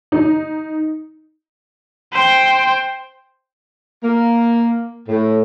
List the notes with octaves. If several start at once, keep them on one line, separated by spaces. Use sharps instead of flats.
D#4
C5 G5
A#3
A2